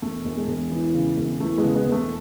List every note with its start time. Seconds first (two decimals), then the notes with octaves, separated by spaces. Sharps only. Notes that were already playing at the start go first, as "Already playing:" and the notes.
0.02 E1 A3
0.25 E1
0.37 G#3
0.48 E1
0.71 E3
0.94 C#3
1.17 E1
1.40 E3 A3
1.58 C#3 G#3 B3
1.75 G#3 B3
1.86 E1
1.92 A3